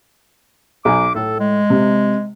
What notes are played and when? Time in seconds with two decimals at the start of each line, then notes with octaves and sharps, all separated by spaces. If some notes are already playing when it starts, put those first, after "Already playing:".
0.85 B1 G#5 D6
1.15 A2 A4
1.40 G#3
1.70 C3